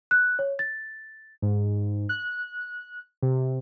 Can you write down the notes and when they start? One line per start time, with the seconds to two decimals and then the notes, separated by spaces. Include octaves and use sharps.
0.11 F#6
0.39 C#5
0.59 A6
1.42 G#2
2.09 F#6
3.22 C3